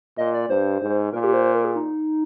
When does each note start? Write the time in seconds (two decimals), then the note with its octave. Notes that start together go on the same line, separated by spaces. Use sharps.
0.18 A#2 D#5
0.34 D5
0.49 G2 C5
0.82 G#2
1.13 A#2 A#4
1.24 G4
1.33 C5
1.44 C5
1.55 A#4
1.65 G#4
1.76 D#4